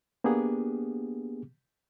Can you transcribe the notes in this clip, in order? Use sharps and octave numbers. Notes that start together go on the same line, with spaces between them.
A#3 B3 D4 G4 G#4